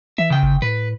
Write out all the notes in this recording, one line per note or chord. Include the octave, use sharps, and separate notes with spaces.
E3 E5
C#3 G5
G1
A2 B4